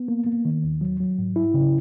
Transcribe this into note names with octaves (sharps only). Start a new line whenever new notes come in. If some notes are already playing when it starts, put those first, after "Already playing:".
Already playing: B3
A#3
A#3
D#3
D#2
F#3
F#3
G#2
E4
C#3